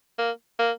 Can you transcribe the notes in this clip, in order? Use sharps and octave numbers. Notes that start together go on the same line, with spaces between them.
A#3
A#3